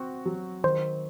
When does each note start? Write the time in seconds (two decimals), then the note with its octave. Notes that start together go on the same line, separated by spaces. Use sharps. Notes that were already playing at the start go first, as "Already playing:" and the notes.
Already playing: C4 F#4
0.26 F#3
0.64 D#3 C5